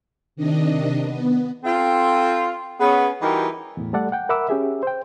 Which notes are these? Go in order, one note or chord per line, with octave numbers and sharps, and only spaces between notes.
C3 D#3 D4 D#5
B3
C4 F4 A4
B3 C#4 G#4
E3 G3 D#4 F#4 G4 A#4
E2 A2
G3 A3 A4 D5 F#5
F#5 G5
A#4 E5 F#5 B5 D6 E6
C#4 G4 G#4 E5
C5 G5